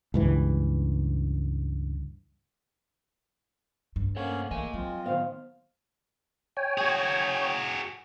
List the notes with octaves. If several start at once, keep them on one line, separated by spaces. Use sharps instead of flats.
C#2 G2 E3
G2
A#3 C#4 A4 C5 C#5 F#5
E3 A3 A#3 D#5 G#5
F3 F#3 C4 F4
D#3 B3 C5 F5
C#5 G5 G#5
F#4 G#4